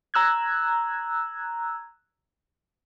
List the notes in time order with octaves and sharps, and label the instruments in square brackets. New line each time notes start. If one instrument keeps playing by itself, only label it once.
[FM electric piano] A#5 E6 F#6 G#6